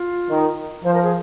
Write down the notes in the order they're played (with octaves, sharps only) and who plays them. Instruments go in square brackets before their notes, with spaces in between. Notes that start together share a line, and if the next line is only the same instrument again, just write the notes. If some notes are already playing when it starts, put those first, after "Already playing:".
Already playing: [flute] F4
[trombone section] D#3
[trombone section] F3 [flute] C5
[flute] A#4
G#4